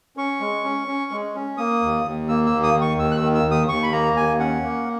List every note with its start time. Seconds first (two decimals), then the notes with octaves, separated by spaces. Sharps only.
0.17 C#4 C#6
0.41 G#3
0.64 C#4
0.88 C#4
1.11 G#3
1.35 C#4
1.57 A#3 D#6
1.82 D#2
2.05 D#2
2.28 A#3 E6
2.46 E6
2.52 D#2
2.63 D#6
2.75 D#3
2.81 C#6
2.98 D#2 E6
3.11 F#6
3.16 E6
3.22 D#3
3.35 E6
3.46 D#2
3.51 D#6
3.69 D#2 C#6
3.83 B5
3.92 A#3 A#5
4.16 D#2 G#5
4.39 C#4 F#5
4.63 A#3